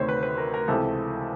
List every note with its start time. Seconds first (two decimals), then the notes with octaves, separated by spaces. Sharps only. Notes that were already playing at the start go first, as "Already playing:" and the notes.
Already playing: D2 C3 D#3 C5 C#5
0.09 B4
0.23 B4
0.38 A#4
0.54 A#4
0.68 C#2 C3 E3 A4